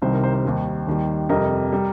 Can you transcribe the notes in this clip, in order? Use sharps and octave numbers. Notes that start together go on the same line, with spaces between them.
C2 C3 D#3 G3 C5
A#4
C5
C5
D#2 D#3 G3
D#2 D#3 G3
F2 C3 G3 A#4 D#5
G3